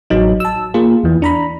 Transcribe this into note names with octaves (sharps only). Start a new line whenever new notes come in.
A1 F#3 D#4
A5 E6
A#3 F4 G#4
E2 E3
D4 A#5 B5